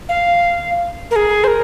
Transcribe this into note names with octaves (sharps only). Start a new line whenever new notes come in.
F5
A#4
G#4
C5
A#4